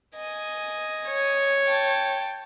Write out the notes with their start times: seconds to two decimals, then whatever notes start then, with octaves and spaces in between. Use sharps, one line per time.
0.16 D#5 G#5
1.08 C#5
1.67 G5 A5